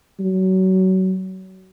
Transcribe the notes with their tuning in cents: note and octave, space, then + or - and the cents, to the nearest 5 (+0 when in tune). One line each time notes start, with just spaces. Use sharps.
F#3 +25